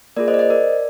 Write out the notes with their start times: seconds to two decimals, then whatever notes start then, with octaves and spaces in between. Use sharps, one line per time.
0.17 A#3 F4 G#4 A#4 D5
0.28 C5 D#5
0.34 D5
0.39 C5 D#5
0.50 A#4 D5